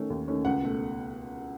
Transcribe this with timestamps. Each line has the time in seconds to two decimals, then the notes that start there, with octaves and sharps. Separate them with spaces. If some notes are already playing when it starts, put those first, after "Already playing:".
Already playing: D#3 A3 C#4
0.10 D#2
0.28 D#3 A3 C#4
0.45 C#2 F#5
0.63 B2 A3